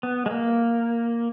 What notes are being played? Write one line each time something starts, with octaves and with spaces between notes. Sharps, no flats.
B3
G#3
A#3